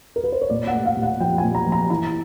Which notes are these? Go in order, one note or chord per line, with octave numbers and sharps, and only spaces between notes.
A#4
B4
C5
C#5
A#2 D5
F#5
A3
F5
A#2
F#5
F3 G5
G#5
A#2
A#5
F3
A#5
E3 A#5